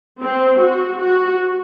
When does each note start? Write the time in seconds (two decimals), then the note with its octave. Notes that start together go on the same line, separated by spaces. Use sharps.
0.22 C4
0.60 F#4
0.99 F#4